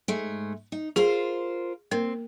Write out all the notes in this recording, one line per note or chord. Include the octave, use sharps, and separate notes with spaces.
G#2 G#3 A3
D#4
F4 G#4 A#4 C5
A#3 C4 A#4